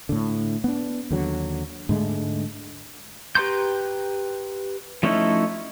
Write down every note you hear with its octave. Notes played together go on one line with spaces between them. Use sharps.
A2 D3
B3 D4
D#2 D3 F#3
G#2 D3 G#3 A3
G4 B4 A#5 C6 G6
F3 A3 C#4 D#4 E4